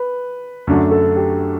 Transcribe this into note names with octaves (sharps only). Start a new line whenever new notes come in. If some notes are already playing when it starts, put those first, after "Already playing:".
Already playing: B4
F#2 D3 A3 D4 F#4
A4
G4